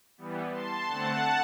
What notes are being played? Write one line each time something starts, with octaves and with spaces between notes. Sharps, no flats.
E3 G3 B3
A5 C6
D3 A3 C4 F#5 A5